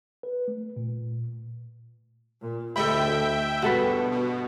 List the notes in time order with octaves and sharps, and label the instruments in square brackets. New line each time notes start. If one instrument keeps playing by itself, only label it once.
[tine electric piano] B4
A3
A#2
[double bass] A#2
[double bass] D2 [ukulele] A4 D#5 B5 [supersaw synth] E5 G5
[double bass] G2 [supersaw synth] B2 [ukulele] F#4 A4 B4
[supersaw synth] B2